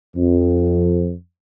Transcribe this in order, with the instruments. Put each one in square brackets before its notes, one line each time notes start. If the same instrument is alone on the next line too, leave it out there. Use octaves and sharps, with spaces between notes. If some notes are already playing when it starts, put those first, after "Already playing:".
[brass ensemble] F2